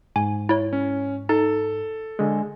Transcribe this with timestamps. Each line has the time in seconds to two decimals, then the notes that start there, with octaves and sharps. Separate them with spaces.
0.16 G#2 G#5
0.49 E4 C#5
0.73 C#4
1.29 D#4 A4
2.19 D3 G#3